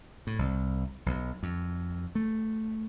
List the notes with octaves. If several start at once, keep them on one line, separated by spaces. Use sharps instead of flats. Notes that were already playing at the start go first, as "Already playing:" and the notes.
A2
C2
B1
F2
A3